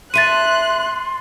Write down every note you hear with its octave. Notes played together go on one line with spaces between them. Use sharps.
D#2 E5 A5 C6 F#6 A6 D#7